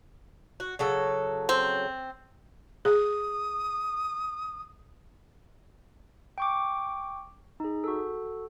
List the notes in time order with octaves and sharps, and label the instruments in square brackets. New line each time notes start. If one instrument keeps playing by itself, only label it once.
[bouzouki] F#4
C#3 F#3 A4
[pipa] C4
[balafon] G#4 [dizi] D#6
[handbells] G5 C#6 D6
D#4 G#4
F#4 A4